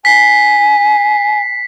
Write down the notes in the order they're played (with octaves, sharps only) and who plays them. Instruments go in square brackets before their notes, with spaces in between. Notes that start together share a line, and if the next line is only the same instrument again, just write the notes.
[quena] G#5 [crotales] B6 C7